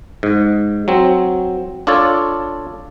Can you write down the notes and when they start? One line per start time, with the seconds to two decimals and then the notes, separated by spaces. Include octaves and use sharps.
0.23 G#2
0.88 F#3 C4
1.87 D4 F4 A4 C#5 D5